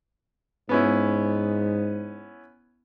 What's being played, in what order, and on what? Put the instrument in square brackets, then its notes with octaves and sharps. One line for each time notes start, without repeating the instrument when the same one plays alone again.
[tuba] G#2 [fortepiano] B3 C#4 E4